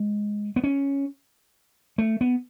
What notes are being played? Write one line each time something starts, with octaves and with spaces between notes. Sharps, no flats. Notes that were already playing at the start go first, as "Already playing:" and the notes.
Already playing: G#3
B3
C#4
A3
B3